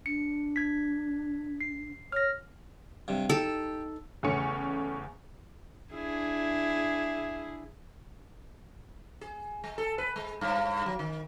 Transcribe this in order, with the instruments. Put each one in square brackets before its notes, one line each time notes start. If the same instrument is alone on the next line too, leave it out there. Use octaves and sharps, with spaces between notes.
[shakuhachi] D4 [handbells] C#7
[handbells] G#6 B6
C7
[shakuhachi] C#5 [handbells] F6 A#6
[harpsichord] G2 C3
[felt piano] D#4 [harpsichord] G4 [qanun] A4 A5
[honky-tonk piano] E2 C#3 A3 C#4 C#7
[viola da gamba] D4 E4 G#4
[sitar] G#4
G#3
A4
B4
G#3
G2
F#3
D#3